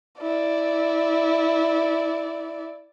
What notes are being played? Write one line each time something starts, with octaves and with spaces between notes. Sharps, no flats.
E4 D5